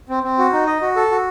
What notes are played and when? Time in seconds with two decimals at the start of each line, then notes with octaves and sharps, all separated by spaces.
0.09 C4
0.23 C4
0.39 F#4
0.53 D#4
0.67 D#5
0.81 F#4
0.96 A4
1.11 F#4